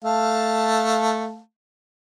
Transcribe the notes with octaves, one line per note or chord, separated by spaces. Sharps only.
A3 F5 A5